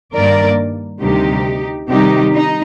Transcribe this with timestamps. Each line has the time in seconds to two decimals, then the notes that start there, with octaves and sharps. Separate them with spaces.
0.13 G2 D#3 A#3 A#4 D5
1.01 D2 C3 D#3 G3 D#4 G4
1.89 C3 D#3 G3 D#4 G4
2.33 D#4